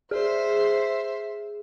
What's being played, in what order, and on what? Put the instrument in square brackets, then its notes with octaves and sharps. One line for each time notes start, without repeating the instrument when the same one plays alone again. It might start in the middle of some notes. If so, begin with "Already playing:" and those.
[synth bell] G#4 [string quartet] C5 E5